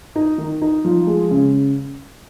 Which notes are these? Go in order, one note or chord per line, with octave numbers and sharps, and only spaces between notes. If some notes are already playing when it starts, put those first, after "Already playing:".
D#4
D#3
D#4
F3
G#3
C#3